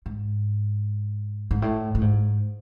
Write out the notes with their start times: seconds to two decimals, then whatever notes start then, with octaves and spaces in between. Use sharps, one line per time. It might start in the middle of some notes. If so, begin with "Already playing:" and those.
0.06 G#2
1.51 G#2
1.62 A2
1.95 A2
2.01 G#2